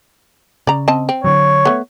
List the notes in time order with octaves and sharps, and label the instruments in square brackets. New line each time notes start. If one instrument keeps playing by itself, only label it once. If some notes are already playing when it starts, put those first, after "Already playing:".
[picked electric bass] C#3 [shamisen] D5 A#5
[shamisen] C4 D#5 A5
C4
[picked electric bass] D3 F#3 [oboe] C#5
[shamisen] A3 B3